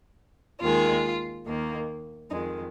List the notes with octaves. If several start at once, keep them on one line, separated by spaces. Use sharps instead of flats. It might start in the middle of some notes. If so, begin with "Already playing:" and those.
D#2 D#3 G#3 F4
D#2 D#3 A#3
F2 D#3 G#3 D#4